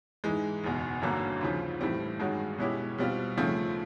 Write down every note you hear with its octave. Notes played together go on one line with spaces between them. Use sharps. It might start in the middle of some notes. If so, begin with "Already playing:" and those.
G#2 E3 G#3
F#1 E2 B2
G#1 G2 D3 F#3 A#3
D#2 C#3 F3
A2 E3 G3 C4
G2 D#3 G#3 C#4 F#4
B2 G#3 C#4 E4 G4
B2 G3 C4 F4
D#2 C#3 F3 A3 C4